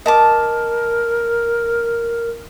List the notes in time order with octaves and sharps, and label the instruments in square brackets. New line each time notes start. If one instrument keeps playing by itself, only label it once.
[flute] A#4 [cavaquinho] D#5 A5 D6